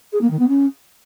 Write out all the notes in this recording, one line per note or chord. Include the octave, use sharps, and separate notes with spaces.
G#4
A#3
D#3
B3
C#4